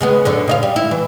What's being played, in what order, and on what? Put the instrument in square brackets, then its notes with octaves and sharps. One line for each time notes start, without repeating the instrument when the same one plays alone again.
[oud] C#3 G#3 B3
F#2 D3 B3
C#3 D#5 F5
G3
E4
E3